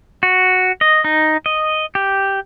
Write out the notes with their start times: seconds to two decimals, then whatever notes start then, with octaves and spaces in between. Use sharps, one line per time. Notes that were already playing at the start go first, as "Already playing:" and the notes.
0.23 F#4
0.81 D#5
1.04 D#4
1.46 D#5
1.95 G4